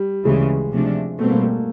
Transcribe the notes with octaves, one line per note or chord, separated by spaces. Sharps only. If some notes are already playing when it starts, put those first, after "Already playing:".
Already playing: G3
D2 C#3 E3 G#3
C3 F3 A3 D4
B2 G3 A3 C4
A#3
A3